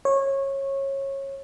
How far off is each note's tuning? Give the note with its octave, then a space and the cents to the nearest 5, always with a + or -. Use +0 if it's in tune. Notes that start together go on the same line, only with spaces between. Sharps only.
C#5 -20